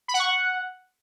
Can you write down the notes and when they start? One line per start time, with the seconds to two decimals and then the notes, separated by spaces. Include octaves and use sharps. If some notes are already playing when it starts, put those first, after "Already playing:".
0.08 B5
0.14 F#5
0.20 C#6
0.25 F#5